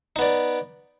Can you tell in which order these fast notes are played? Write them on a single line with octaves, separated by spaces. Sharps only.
D#4 B3 D5